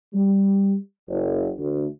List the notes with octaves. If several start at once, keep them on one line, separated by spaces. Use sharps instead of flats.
G3
F#1
D2